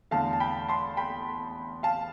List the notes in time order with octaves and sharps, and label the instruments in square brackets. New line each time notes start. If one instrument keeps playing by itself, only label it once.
[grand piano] E2 D3 A3 F5 A5
A5
G5 B5
A5 C6
G5 B5
F5 A5